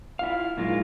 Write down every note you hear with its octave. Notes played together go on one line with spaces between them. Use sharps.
E4 F4 F5
A#2 F#3 G#3 A#3 D#4 F4